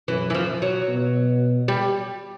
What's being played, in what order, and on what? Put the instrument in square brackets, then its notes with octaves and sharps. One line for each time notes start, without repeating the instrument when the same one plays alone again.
[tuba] F#2 [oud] E3
[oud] E3
F3
F#3
[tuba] B2
[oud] G3